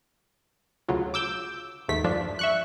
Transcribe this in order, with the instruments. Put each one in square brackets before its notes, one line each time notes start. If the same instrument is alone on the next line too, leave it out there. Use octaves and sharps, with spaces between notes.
[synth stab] D2 C#3 F#3 F4
D6 E6 G6
D#2 G#2 A3 B6
G2 F3 D4
E5 C#6 F#6